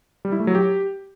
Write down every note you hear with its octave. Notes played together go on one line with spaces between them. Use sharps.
G3
E4
A3
F#3
G4